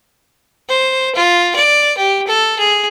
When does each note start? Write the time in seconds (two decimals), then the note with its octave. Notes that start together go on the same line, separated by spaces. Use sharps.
0.69 C5
1.15 F4
1.56 D5
1.97 G4
2.27 A4
2.59 G#4